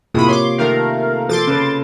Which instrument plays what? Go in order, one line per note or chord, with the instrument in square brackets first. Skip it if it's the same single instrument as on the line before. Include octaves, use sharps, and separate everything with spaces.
[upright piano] A2 G#3 [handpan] C3 A#3 F4 [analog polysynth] B5 D#6
[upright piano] C#5 [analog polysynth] C6 D6
[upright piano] D#3 [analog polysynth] A3 A#4 F5
[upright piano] F3 [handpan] A4 [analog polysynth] C6 D6 A6
[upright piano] C#3 B4